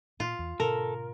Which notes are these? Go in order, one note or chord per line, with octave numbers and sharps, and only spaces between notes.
A#2 F4
E2
G#2 B2 D3 A4 A#4